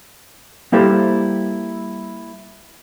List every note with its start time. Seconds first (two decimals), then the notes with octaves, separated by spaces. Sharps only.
0.72 G3 A#3 E4 G4 A4 C5